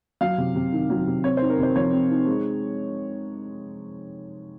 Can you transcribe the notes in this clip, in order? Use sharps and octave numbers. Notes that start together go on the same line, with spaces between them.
F#3 F5
C3
C3
D#3
F#3
C3
C4 C#5
C5
D#4
A#4
C3 C5
F3 C#5
C4
D#4
G#3